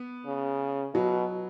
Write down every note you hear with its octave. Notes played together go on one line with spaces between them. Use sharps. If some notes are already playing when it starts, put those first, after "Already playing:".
Already playing: B3
C#3
B2 F#3